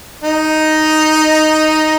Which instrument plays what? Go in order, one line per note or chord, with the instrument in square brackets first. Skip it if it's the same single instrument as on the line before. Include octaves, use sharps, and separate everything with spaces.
[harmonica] D#4